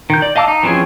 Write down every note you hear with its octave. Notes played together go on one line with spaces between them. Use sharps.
D#3 G6
D5
D#5 F5 A5 D6 E6
D#4
E3 F3 C4 C#4 G#4